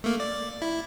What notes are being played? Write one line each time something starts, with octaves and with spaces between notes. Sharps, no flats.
A3 A#3
D5
E4